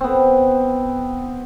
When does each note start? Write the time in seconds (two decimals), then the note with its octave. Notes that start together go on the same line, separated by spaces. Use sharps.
0.01 B3 C4